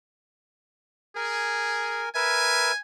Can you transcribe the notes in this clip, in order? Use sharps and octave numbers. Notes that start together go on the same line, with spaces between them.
G#4 A#4 G#5
A#4 B4 E5 G#5